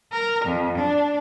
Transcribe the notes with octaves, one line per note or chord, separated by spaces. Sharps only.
A#4
F2
D4